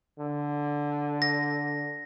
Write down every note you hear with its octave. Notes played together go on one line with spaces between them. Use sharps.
D3
A#6